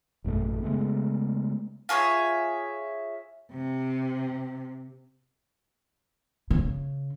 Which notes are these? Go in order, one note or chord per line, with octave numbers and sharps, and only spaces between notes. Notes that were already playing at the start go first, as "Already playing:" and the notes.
A1 F#2 B2 A3
C#3 G#3 A3 B3
F4 G#4 C#5 E5
C3
C#3